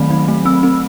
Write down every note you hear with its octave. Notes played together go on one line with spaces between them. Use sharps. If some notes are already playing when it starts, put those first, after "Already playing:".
Already playing: D#3 F#3 A3 C4 B5
F#3
A3
C4 E6
C4